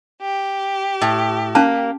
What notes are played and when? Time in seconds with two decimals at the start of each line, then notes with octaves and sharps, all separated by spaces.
0.22 G4
1.01 A2
1.55 A#3 C#4 A5